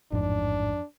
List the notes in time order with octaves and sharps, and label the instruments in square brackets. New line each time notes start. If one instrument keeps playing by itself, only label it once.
[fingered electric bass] A1 G#2 [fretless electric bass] F2 [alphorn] D4